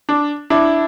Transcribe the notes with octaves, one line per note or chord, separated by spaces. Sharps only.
D4
D4 E4